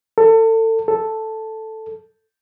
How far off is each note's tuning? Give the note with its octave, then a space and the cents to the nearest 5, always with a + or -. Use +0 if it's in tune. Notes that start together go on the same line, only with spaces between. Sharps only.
A4 +30
A4 +0